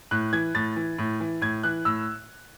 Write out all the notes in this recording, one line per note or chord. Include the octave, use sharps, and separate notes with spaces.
A2 F#6
E3 G#6
A2 A6
E3
A2
E3
A2 G#6
E3 F#6
A2 E6